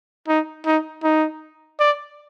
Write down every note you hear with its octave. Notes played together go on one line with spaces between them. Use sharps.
D#4
D#4
D#4
D5